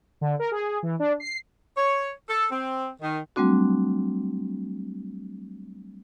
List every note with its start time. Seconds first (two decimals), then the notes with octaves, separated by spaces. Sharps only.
0.21 D3
0.39 A#4
0.52 G#4
0.83 E3
0.99 D4
1.20 C7
1.77 C#5
2.29 A4
2.52 C4
3.02 D#3
3.36 F#3 G3 A3 C4 D4 F#4